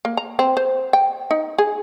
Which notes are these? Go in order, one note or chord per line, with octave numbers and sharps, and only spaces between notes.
A#3
A#5
C4
C5
G5
D#4
G#4